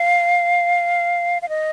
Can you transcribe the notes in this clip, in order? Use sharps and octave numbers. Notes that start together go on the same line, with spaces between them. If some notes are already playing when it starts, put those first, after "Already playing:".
Already playing: F5
F5
D#5